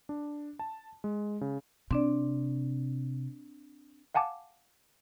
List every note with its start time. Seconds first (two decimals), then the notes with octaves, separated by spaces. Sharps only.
0.09 D4
0.59 A5
1.04 G#3
1.41 C#3
1.91 C3 C4 D4 D5
4.15 F5 F#5 G#5 A5 D6